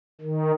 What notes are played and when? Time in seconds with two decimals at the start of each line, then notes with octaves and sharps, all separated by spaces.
0.21 D#3